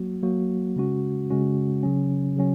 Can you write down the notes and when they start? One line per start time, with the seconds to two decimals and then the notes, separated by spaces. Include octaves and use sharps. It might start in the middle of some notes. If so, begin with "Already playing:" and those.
Already playing: F#3 A#3 F#4
0.23 F#3 A#3 F#4
0.76 C#3 G#3 C#4 F#4
1.30 C#3 G#3 C#4 F#4
1.83 C#3 F#3 C#4
2.37 C#3 F#3 C#4